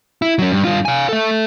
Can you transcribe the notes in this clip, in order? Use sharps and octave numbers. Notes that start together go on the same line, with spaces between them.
E4
F#3 C#4
G2
G2 F4
F5 G#5
A4 E5